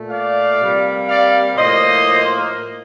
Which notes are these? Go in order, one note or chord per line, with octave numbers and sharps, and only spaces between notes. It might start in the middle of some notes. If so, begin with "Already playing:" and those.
Already playing: A#2 A3
D5 F5
C3 G3 A#3
D5 F5
A2 F3 A#3 C5 D#5